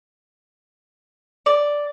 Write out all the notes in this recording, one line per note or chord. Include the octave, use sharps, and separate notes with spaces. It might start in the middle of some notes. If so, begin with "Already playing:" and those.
D5